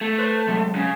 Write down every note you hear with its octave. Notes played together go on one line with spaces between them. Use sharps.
A3
B4 C5
C3 F#3 G#3
C#3